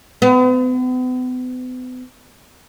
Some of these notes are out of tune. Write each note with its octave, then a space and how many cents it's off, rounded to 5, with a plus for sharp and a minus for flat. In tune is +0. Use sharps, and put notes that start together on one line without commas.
B3 +40